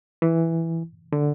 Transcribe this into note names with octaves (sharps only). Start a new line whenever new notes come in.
E3
D3